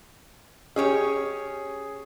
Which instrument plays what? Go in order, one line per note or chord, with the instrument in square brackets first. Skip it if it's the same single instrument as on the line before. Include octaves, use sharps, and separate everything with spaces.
[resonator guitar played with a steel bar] C#4 G4 C#5 [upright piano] G#4